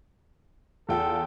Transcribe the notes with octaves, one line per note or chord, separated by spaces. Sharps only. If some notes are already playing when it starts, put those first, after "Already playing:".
E2 F4 A4 G5